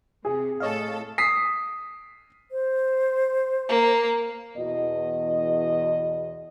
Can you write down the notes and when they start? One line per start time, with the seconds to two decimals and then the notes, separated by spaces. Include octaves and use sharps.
0.25 C3 G#4
0.60 A2 A4 C#5 D#5 F5
1.18 D#6 B6 C7
2.51 C5
3.69 A#3
4.56 E2 B2 D#5